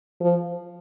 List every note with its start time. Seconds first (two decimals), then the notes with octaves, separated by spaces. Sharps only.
0.21 F3